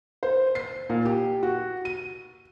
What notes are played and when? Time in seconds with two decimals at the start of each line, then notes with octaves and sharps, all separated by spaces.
0.23 C5
0.55 C7
0.89 A#2
1.05 G4
1.43 F#4
1.85 D#7